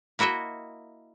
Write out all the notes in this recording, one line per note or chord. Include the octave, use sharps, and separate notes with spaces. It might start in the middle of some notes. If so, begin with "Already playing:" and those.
A#3 E4 F#4 D#5 E5